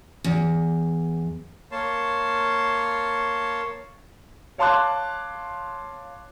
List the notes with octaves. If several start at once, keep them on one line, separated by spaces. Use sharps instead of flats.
E2
A#3 C#5 A5 C6
C#5 F5 A5 C6 D6 F#6